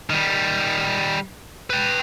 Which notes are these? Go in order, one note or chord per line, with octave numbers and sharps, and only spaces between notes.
D#3 G3
B4 G5